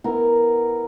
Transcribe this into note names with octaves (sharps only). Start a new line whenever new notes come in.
B3 E4 A#4